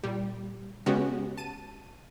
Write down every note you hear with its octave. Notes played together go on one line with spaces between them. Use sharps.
A#2 G3
C#3 G#3 B3 C#4 F#4 G4
A5 D#7